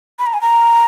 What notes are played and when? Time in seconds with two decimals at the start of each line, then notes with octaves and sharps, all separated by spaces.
0.19 B5
0.27 A#5
0.33 G#5
0.41 A#5